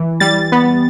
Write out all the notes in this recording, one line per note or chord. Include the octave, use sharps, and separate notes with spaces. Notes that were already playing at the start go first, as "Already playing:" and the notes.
Already playing: E3
G3 A6
B3